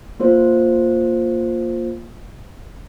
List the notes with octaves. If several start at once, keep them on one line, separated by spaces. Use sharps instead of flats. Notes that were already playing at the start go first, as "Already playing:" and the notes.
A#3 F4 C5